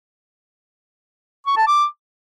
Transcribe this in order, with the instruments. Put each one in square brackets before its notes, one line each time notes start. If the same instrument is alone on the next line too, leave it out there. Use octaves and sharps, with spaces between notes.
[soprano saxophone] C#6
A5
D6